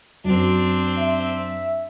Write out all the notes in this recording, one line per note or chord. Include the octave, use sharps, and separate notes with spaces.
F#2 C4 D4
E5